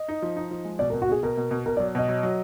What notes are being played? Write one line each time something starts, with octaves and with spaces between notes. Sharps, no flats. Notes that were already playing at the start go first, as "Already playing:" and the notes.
Already playing: D#5
D#4
F3
D#4
F3
G#3
B2 D5
A#4
B2
F#4
B2 G#4
B2 A#4
B2
B2
B2 A#4
D5
F#3
B2 D#5
F#3
F#3